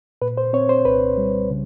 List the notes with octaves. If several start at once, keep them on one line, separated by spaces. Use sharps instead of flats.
A#2 B4
C5
C4 C#5
C5
C2 B4
G3
C#3